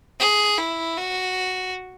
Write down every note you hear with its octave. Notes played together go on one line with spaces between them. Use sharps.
G#4
E4
F#4